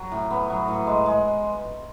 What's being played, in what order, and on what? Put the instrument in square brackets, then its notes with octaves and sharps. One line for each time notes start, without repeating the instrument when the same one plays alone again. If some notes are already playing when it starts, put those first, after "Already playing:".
Already playing: [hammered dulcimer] F#3 F#4
A2
B3
F#3
A2
G#3
G#3